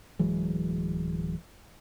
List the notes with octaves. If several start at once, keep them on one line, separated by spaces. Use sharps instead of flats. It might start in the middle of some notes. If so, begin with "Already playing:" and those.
D1 E3 F#3 G#3